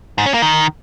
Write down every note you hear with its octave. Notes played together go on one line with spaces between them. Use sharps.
G#2
C#4
A#3
D#3